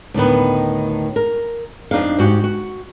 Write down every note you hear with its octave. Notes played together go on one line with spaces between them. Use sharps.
D2 A2 D#3 B3
A#4
F2 D4 D#4 F5
G#2 F#4 G4
F#4